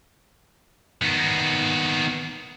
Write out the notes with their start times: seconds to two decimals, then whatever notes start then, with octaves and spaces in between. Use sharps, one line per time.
1.02 D#3 B3